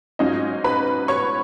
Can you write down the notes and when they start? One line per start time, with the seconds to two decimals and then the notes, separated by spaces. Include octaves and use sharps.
0.19 G#2 F#3 C#4 D#4 F4 D#5
0.64 B4 B5
1.08 C#5 C#6